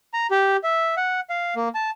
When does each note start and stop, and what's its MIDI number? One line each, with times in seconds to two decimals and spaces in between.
0.14 0.27 82
0.31 0.57 67
0.64 0.95 76
0.97 1.20 78
1.30 1.54 77
1.56 1.69 58
1.75 1.90 81